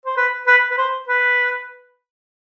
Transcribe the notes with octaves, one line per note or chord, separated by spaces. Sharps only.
C5
B4
B4
B4
C5
B4